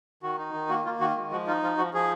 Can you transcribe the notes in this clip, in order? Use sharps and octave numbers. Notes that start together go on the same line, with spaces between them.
D#3 F#4
D#4
D#3
A#3 F#4
A#3 F4
D#3 F#4
G#3
F3 F#4
D#4 F4
F3 F4
F3 F#4
F3 G#4